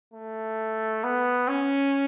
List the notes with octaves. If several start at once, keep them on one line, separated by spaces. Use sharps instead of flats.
A3
B3
C#4